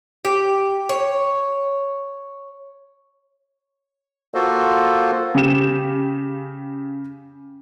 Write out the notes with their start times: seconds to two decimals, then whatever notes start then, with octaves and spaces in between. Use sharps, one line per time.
0.25 G4
0.89 C#5
4.34 A#3 F4 F#4 A4 C5
5.34 C#3 G4 E7